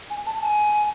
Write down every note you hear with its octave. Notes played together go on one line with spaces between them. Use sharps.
G#5
A5
G#5